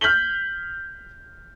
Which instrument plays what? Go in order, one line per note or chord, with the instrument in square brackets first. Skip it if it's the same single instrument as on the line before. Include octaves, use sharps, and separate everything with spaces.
[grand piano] F6 G6 B6 F#7 G7